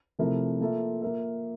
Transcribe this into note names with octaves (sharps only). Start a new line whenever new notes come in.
C3 F3 A3 E4 A#4
A#3 F4 A4 E5
A#3 F4 A#4 E5